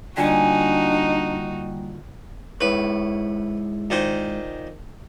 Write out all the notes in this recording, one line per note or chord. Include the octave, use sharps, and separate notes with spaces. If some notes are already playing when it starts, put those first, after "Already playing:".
D3 G3 A#3 D4 D#4 F4 F#4 G#5
G#2 E4 B4 C#5
A#2 D#3 C5